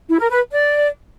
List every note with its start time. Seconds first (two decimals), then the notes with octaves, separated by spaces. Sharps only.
0.08 E4
0.19 A#4
0.30 B4
0.50 D5